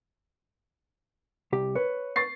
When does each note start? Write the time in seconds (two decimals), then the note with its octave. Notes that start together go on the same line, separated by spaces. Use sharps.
1.52 C2 G4
1.75 B4 C#5
2.16 C#6 A6 C7